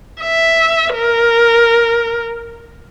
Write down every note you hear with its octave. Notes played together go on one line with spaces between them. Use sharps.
E5
A#4